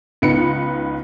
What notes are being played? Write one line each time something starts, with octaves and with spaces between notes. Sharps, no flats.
C#2 B3 D#4 B4 C#7